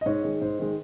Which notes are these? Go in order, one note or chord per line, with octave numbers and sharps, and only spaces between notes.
D#5
G#2 C#5
D#3 G#3
G#2 C5
D#3 G#3